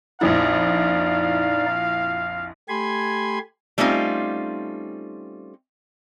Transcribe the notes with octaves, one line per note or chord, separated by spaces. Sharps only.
A#1 F2 D#4 E4 D5 F5
A3 G4 G#5 B5 C6 G#6
G3 A3 C4 C#4 D#4 F4